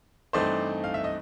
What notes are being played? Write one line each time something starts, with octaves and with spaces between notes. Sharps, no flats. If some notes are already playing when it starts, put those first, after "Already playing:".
G2 E3 A3 C4 D#4 C5 D5
F5
E5
D#5